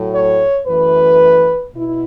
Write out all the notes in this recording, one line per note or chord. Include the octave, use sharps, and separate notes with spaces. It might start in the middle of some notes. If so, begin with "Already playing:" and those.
Already playing: A2 F#3 A3
C#5
F#2 E3 A3 B4
B2 E4